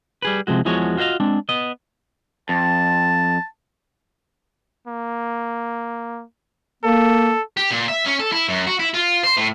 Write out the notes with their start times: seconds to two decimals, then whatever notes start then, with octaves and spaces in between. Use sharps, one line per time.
0.22 G3 G#4 B4
0.47 C3 F3 G#3 F#4
0.65 E2 E3 F3 G#3 F#4 C#5
0.97 F4 F#4 C5 D#5 F5
1.20 G#3 C4 D4
1.49 B3 D#5
2.49 F2 A5
4.88 A#3
6.84 A#3 A4
7.57 G4
7.70 A#2
7.88 E5
8.06 C#4
8.20 A4
8.32 E4
8.49 F#2
8.67 F#4
8.80 E4
8.94 F4
9.24 C5
9.37 A2